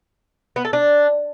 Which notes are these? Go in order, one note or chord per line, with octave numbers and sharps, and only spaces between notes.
B3
A4
D4